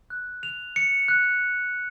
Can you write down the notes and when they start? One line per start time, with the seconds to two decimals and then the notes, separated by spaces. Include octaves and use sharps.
0.10 F#6
0.43 F7
0.76 C#7
1.08 F#6